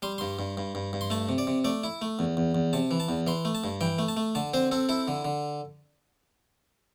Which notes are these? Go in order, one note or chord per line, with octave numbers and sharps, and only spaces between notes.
G3 C6
G2 C6
G2
G2
G2
G2
C6
A3 A5
C3
D5
C3
A3 D5
E4
A3
E2
E2
E2
C3 A5
E3
A5
E2
E3 C6
A3
A5
G2
E3 G5
A3
A5
A3
D3 A5
C4 C5
C4 A4
E4 A4
D3
D3